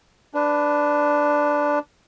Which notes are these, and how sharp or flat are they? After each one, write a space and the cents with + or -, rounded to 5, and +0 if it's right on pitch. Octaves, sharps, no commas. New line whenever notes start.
D4 +0 B4 +10